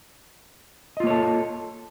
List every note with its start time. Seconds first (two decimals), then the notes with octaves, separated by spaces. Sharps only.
0.97 D#5
1.00 F4
1.04 A#3
1.07 C#5
1.10 A4